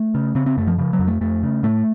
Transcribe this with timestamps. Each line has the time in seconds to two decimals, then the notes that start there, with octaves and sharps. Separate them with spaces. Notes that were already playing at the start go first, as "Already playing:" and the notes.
Already playing: A3
0.15 C#3
0.35 C#3 C4
0.46 C4
0.57 F#2 A3
0.67 F3
0.78 C#3 F3
0.93 F#3
0.99 F2
1.07 A3
1.21 F2 A3
1.43 C#3
1.63 A2 A3